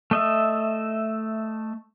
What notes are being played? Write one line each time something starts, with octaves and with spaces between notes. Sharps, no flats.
A3 D#5 E5